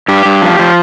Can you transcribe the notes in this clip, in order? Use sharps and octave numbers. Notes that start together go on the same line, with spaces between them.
G2 G4
G2
F3
F3